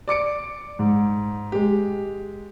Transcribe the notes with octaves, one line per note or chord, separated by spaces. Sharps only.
D5 D6 C#7 D7
G#2
G#3 G4